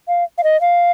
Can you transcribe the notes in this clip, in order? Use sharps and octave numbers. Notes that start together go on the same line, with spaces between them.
F5
F5
D#5
F5